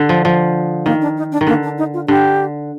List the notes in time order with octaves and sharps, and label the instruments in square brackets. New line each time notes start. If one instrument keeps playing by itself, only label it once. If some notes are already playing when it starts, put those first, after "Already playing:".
Already playing: [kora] D3
F3
F3
[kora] D#3 [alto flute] A#3
[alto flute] D4
D#4
D4
[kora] D#3
[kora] D3 [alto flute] A#3
[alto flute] D4
D#4
F4
[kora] D3 [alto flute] G4